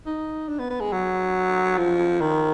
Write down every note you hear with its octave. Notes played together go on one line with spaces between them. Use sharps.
D#4
D4
B3
B3
G#3
F#3
F3
D#3